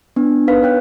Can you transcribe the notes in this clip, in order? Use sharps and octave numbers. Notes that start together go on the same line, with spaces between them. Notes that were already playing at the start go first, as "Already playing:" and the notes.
B3 D4
D#4 A#4 B4 F5 B6
C#5 G5 F#6